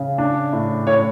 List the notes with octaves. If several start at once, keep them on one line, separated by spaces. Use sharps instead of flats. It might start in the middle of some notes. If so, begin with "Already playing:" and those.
Already playing: C#3
D4
A2
A2 C#5